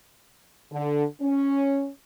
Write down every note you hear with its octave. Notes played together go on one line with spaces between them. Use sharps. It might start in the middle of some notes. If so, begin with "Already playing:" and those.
D3
C#4